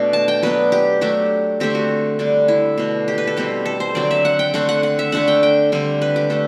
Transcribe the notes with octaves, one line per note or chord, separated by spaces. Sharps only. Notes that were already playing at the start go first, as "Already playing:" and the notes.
Already playing: B2 A3 D4
A5
G5
F#3 B3 D4 B4
G4
F#3 A3 D4 G4
D3 A3 C4 G4
F#4
D3 G3 D4
E4
B2 A3 D4
G4
B4
A4
B2 G3 C4 G4
A4
C5
D3 F#3 C4 D5
E5
F#5
G5
D3 A3 C4 F#5
F#5
F#5
E5
D3 A3 D4 F#5
G5
G5
D3 G3 C4
B4
G4
A3 D4 A4